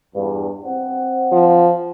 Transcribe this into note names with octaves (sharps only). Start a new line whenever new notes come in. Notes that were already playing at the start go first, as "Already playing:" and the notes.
E2 G2
C4 C5 F#5
F3